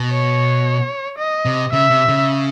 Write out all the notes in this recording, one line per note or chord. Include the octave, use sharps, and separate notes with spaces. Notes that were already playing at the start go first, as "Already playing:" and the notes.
Already playing: B2
C#5
D#5
C3
C#3 E5
C3
C#3